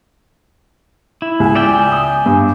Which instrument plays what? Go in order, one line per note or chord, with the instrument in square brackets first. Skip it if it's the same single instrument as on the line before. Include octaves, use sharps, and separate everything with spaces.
[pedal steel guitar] E4
[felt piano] C#2 [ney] G#5
[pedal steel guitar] D5 E5 G5
[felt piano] D#6
G2